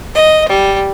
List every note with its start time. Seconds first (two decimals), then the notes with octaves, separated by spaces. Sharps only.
0.14 D#5
0.49 G3